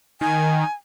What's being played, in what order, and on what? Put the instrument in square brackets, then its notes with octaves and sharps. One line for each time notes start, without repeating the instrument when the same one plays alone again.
[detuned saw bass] D#3 [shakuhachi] G#5